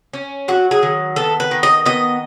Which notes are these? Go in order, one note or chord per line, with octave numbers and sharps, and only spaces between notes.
C#4
F#3 F#4
G#4
D#3
B3 A4
B4
D#3
D#5
B3 D#5